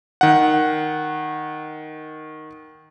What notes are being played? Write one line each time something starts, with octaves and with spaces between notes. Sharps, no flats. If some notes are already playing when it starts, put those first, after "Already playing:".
D#3 F#5